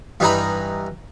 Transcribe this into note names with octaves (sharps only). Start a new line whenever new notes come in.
G2 E3 D#4 G#5 A#5 B5